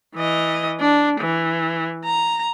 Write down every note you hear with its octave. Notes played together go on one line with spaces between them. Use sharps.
E3 D#5
D4
E3
A#5